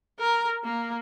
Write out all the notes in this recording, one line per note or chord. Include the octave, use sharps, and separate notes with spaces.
A#4
A#3